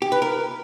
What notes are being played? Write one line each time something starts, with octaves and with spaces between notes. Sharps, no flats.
G4
B4
A#4